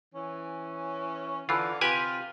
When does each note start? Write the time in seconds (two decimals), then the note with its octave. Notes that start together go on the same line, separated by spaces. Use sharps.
0.15 E3 C#4
1.49 D3 E3 F4
1.81 C3 F4 G4 B4 G#5